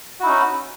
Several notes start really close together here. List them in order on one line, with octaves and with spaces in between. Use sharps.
F#4 E4 D#4 C#4